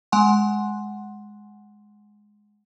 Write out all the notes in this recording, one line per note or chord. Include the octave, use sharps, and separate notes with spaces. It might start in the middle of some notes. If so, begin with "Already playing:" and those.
G#3 F#5 G#5 C6